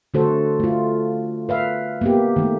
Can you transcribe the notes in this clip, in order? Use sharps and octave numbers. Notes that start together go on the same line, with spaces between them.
D3 A3 F#4 A4 C5
A3 F4
B4 E5 F5
A#3 B3 G4
D#3 A3